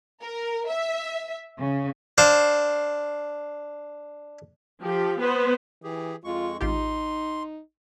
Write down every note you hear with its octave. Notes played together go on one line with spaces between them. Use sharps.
A#4
E5
C#3
D4 C5 F5
F3 G4
B3 B4 C5
E3 G4 G#4
F2 G#3 F4 C#6
A1 D#4 F4 G4 C6